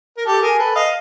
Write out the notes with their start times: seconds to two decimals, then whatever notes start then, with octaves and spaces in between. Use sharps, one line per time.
0.18 A#4
0.26 G4 A4
0.42 G#4 A#4
0.58 A4 B4
0.75 D#5 F5